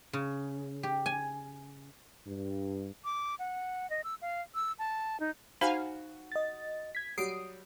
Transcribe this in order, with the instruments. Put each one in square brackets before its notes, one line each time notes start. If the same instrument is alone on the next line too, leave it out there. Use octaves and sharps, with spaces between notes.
[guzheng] C#3
G4
G#5
[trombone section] G2
[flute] D6
F#5
D#5
E6
F5
E6
A5
D#4
[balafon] D#4 C5 B5 [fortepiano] F#4 [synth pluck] F5 G#5
[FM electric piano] D#5 A6
G#6 B6
[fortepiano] F#3 G3 [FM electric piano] D#6 [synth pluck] C7 D7